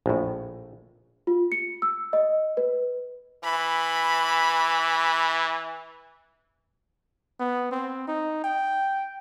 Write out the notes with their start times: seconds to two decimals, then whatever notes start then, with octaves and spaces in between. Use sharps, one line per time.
0.06 A#1 A2
1.27 F4
1.52 C#7
1.82 E6
2.13 D#5
2.57 B4
3.44 E3 B5
7.40 B3
7.72 C4
8.07 D#4
8.44 G5